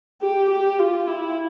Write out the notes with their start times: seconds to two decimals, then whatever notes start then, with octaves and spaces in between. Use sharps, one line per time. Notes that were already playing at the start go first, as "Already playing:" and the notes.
0.22 G4
0.50 G4
0.79 F4
1.07 E4